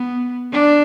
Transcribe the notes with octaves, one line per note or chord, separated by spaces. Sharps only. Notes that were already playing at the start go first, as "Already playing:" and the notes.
Already playing: B3
D4